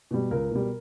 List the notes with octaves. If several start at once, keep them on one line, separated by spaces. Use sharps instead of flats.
B2 G3
C#2 A#4
B2 G3